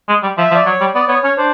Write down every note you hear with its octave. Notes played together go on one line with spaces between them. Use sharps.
G#3
G3
F3 E5
F3
D5
F#3 C#5
G3
B3 D5
B3 C#5
C#4 C#5
D4 C5